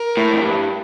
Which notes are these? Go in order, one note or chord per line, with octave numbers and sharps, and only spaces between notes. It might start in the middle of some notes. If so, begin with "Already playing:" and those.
Already playing: A#4
A2
F2
G2